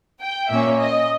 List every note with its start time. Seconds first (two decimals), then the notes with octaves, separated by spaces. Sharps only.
0.20 G5
0.49 A#2 A#3 C#4 E5
0.79 D#5